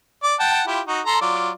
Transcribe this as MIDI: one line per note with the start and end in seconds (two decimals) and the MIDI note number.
0.23 0.35 74
0.40 0.62 78
0.40 0.62 79
0.40 0.62 81
0.67 0.81 64
0.67 0.81 65
0.67 0.81 67
0.87 1.01 63
0.87 1.01 66
1.06 1.21 69
1.06 1.21 82
1.06 1.21 84
1.22 1.51 54
1.22 1.51 65
1.22 1.51 74